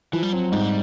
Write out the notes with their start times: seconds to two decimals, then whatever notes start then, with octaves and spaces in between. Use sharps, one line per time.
0.13 E3 F3
0.23 G3
0.33 F#3 C4
0.52 G#2 G3